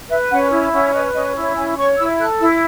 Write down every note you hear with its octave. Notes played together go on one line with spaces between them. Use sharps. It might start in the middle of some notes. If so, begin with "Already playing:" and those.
B4 E5
C#4 F#5
E4 E5
C#4 F#5
B4 D#5
C#4 D#5
E4 C#5
C#4 G#5
C#5 C#6
E4 E6
A4 F#6
E4 E6